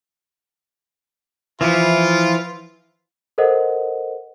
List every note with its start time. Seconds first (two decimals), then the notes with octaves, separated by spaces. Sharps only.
1.61 E3 F3 E4 F4
3.38 A4 A#4 C5 D#5 F#5